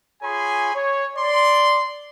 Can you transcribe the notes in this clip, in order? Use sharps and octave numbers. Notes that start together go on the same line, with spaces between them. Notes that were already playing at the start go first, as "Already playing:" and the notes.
F4 G#4 C#5 G#5 B5 C6
C#5
D5 C6